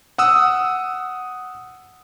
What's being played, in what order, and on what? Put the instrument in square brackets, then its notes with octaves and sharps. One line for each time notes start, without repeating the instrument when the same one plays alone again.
[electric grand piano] F#5 D#6 E6